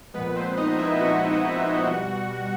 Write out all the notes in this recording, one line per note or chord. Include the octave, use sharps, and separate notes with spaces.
A#2 F3 G#3 B3 B4
C4 C5
D#4 D#5
E4 E5
A#2 F3 G#3 F#4 F#5
B2 G3